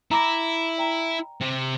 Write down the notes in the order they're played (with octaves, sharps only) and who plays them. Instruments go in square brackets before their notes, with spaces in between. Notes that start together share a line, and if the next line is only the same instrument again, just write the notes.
[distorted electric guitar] E4 [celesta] A#5 D6 A#6
[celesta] D5 G5 A#5
[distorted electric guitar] C3